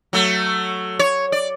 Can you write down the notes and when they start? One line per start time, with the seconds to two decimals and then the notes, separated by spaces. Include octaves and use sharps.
0.13 F#3 A3
0.99 C#5
1.32 D5